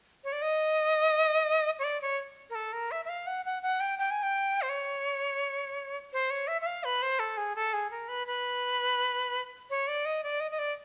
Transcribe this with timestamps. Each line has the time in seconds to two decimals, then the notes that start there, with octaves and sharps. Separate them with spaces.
0.24 C#5
0.32 D5
0.42 D#5
1.79 C#5
1.84 D5
2.02 C#5
2.50 A#4
2.55 A4
2.73 A#4
2.91 E5
3.05 E5
3.09 F5
3.27 F#5
3.45 F#5
3.63 F#5
3.80 G5
3.99 G5
4.11 G#5
4.23 G5
4.62 C5
4.69 C#5
6.13 C5
6.30 C#5
6.48 E5
6.61 E5
6.66 F5
6.84 B4
7.02 C5
7.19 A4
7.37 G#4
7.56 A4
7.73 G#4
7.91 A#4
8.08 B4
8.27 B4
9.70 C#5
9.88 D5
10.05 D#5
10.23 D5
10.40 D#5
10.51 D#5
10.59 D5